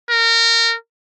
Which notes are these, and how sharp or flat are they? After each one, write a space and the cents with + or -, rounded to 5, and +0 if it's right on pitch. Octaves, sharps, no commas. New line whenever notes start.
A#4 -25